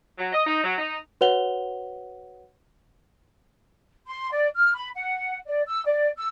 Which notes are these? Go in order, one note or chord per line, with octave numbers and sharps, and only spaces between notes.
F#3
D#5
D#4
F#3
D#4
F#4 B4 C#5 F#5 F7 G7
C6
D5
F6
B5
F#5
D5
E6
D5
E6